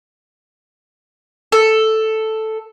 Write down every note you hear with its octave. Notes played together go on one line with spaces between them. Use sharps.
A4